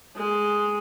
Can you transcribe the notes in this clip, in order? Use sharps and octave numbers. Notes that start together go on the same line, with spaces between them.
G#3